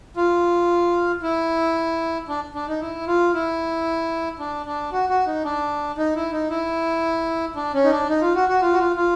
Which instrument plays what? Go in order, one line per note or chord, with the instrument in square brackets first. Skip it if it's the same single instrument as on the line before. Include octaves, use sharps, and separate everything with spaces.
[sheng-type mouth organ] F4
E4
D4
D4
D#4
E4
F4
E4
D4
D4
F#4
F#4
D#4
D4
D#4
E4
D#4
E4
D4
C#4
D#4
D4
D#4
F4
F#4
F#4
F4
F#4
F4
F4